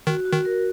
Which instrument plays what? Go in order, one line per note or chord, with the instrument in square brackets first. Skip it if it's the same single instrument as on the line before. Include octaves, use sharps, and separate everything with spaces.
[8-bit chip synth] D#3 [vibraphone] F#4
[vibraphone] F#4
[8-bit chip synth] D#3
[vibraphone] A#4